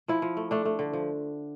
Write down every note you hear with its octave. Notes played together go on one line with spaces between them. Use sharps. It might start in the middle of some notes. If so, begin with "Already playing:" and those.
F3 E4
F3
A3
A3 D4
A3
D3
F3